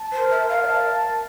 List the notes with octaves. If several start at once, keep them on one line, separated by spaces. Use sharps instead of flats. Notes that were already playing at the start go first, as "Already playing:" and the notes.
Already playing: A5
C5
A#4
E5
A#4
F5
D5
E5 A5